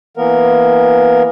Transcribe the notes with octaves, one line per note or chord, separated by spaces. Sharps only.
E3 A#3 B3 A#4